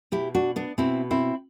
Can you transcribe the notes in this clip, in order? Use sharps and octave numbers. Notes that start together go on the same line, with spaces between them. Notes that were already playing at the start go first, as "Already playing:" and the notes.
B2 E4 G4
D4 F#4
B3 D4
B2 C4 E4
C4 E4